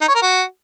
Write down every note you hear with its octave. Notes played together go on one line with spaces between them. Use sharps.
D#4
C#5
A#4
F#4